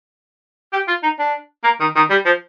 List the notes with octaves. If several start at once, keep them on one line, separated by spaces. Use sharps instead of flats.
G4
F4
D#4
D4
A#3
D#3
D#3
G3
F3